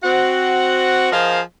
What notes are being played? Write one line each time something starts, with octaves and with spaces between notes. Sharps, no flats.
C4 F#4 F#5
F3 G#4 A#4 C5 D#5 F5